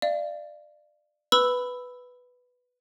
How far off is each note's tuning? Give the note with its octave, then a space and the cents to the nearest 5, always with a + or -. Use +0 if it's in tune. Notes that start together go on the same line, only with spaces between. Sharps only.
D5 +25 F5 -35
B4 +0 B5 +10 E6 -5